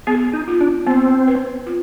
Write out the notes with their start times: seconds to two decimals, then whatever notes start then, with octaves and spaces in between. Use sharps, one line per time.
0.07 B3 G#4
0.33 D#4
0.48 F4
0.61 D4
0.87 B3 C4
1.28 B4
1.66 F4